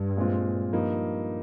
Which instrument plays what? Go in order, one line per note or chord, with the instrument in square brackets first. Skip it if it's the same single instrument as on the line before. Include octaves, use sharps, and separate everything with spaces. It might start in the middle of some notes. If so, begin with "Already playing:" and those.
Already playing: [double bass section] G2
[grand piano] A#2 G#3 C4 F4
G2 F3 A#3 D#4